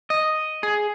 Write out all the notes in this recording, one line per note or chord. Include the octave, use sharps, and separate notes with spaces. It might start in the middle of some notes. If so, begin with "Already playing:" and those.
D#5
G#4